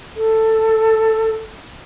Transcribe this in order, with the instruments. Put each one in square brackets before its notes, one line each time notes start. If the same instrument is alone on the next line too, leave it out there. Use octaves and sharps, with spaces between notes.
[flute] A4